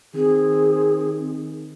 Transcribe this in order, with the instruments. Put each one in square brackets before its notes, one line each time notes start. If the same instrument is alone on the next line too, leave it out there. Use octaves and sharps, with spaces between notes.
[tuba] D#3 [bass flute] C4 [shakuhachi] G#4